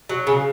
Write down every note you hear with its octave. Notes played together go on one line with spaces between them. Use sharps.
F#3
C#3